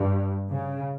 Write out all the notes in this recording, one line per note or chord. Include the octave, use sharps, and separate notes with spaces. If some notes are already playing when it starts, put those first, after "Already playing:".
Already playing: G2
C#3